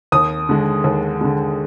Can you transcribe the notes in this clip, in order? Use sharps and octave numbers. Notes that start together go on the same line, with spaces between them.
D#2 D#6
D3 G#3
D#2
D3 G#3